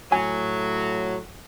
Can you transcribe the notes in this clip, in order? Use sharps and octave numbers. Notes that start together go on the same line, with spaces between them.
A2 F#3 G#5